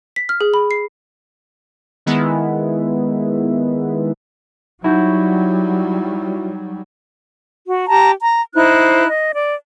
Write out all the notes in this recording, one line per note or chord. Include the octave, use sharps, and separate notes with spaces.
B6
F6
G#4
B5
C7
D#3 G#3 B3 E4
F#3 G3 D#4 E4 F#4 G6
F#4
G4 A5 A#5
A#5
D#4 E4 C5 F#6
D#5
D5